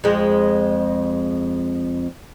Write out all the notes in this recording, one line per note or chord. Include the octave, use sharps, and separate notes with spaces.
F2 G#3